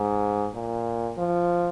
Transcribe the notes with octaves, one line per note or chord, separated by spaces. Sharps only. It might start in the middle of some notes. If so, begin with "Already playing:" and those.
Already playing: G#2
A#2
F3